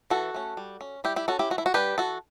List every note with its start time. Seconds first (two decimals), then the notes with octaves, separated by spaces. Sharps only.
0.10 E3 F#4 A4
0.34 A3 C#4
0.57 G3
0.81 C#4
1.04 G3 E4 G4
1.16 E4 G4
1.28 C#4 F#4 A4
1.39 E4 G4
1.50 E3 F#4
1.58 E4
1.66 F#4
1.74 G3 D4 G4 B4
1.98 E3 F#4 A4